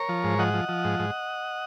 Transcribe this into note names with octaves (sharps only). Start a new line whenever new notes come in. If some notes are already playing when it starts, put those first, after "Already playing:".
Already playing: A#4 C#5
F3
G#2
F3 D#5 F#5
F3
F3
G#2
G#2